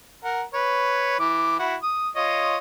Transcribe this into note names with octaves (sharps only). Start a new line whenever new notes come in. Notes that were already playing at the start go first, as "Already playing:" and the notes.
A#4 F#5
B4 C#5
E3 D6
E4 F#4
D#6
F4 C#5 D#5